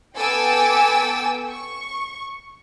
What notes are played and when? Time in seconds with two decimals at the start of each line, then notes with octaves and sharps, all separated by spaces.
0.17 B3 A4 G5 G#5 D6 E6
1.49 C#6